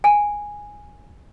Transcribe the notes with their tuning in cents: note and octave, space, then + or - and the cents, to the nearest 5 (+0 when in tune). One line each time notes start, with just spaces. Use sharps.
G#5 -5